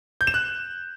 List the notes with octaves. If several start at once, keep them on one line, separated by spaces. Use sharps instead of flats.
G6
E7
F#6